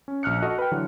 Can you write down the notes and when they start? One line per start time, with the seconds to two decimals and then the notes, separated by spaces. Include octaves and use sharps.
0.08 C#4
0.23 A#1 F6 F#6 C#7
0.42 F#4 A4 D#5
0.59 B4 G5
0.71 D3 E3 F#3